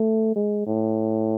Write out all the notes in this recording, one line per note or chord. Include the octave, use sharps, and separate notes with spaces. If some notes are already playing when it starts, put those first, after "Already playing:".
Already playing: A3
G#3
A2